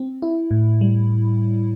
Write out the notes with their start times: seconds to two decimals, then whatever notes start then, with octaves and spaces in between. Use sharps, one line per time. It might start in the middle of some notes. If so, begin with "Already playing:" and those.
Already playing: C4
0.22 E4
0.51 A2
0.81 G3